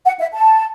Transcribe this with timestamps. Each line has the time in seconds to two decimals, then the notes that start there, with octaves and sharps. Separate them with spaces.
0.05 F#5
0.20 E5
0.34 A5